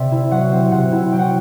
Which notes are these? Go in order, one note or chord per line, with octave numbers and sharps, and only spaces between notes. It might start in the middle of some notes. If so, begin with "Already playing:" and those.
Already playing: C3 C4 D5 E5
E4
F#3 F#5
C4
C3 F#5
E4
F#3 G5
F#5